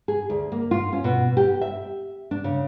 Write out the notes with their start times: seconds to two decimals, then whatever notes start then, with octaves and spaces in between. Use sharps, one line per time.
0.08 G#4
0.30 D2
0.52 A#3
0.71 F4
0.93 C#4
1.04 B2
1.37 G4
1.61 E5
2.31 D4
2.44 C#3